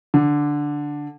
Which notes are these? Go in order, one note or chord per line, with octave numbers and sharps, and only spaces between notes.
D3